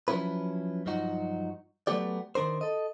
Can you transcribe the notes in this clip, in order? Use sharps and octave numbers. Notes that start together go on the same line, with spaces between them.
F3 F#3 C#4 E4 B4
G2 F3 F#3 D#4 F#4
F#3 A3 B3 G4 D5
D#3 D4 A#4 C5
A4 D#5